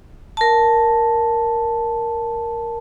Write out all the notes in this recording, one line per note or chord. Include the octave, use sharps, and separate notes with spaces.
A#4 A5